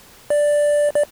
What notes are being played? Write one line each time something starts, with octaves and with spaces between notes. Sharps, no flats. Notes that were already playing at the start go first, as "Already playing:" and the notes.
D5
D5